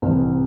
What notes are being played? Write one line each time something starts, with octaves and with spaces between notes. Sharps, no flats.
C2 C3 E3 C4 C5